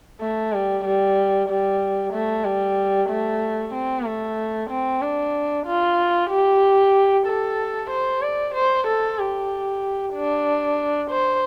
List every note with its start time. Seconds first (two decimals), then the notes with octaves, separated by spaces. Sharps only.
0.21 A3
0.53 G3
0.85 G3
1.49 G3
2.13 A3
2.45 G3
3.10 A3
3.74 C4
4.06 A3
4.70 C4
5.02 D4
5.66 F4
6.30 G4
7.27 A4
7.91 C5
8.22 D5
8.55 C5
8.87 A4
9.19 G4
10.14 D4
11.11 C5